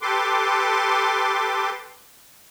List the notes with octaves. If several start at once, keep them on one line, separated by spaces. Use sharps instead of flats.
G4 A4 B4 C6 D6